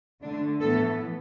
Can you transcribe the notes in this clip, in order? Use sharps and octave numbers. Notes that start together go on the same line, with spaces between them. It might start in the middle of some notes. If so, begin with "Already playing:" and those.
D3 A3 D4
A2 E3 A3 B3 A4